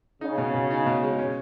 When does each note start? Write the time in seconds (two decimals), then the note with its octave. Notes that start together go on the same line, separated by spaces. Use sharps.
0.21 C#3 D#4
0.38 B2
0.54 B2
0.71 D#4
0.86 B2
1.03 G#3
1.19 C#4